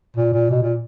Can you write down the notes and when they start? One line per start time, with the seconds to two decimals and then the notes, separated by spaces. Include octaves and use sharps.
0.16 A#2
0.33 A#2
0.51 B2
0.62 A#2